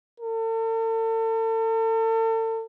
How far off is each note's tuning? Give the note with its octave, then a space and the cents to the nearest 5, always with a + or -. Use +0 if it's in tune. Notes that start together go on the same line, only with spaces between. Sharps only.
A4 +40